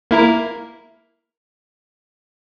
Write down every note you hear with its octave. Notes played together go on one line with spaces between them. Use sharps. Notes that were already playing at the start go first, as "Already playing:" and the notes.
A#3 E4 A#4